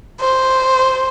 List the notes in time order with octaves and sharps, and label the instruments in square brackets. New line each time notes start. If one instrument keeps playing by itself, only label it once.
[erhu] C5